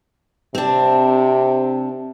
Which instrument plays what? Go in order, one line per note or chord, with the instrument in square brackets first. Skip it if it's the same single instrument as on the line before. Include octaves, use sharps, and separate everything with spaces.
[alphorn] C3 [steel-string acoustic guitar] C4 D4